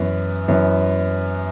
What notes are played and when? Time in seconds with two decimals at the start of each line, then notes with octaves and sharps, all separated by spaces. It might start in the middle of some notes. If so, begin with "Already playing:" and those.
Already playing: F#2 E3 B3
0.48 F#2 E3 B3